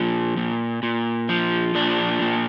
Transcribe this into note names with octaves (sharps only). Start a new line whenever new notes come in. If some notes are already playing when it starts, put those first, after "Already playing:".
Already playing: A#2 F3
A#2
A#2
F3
A#2 D4
A#2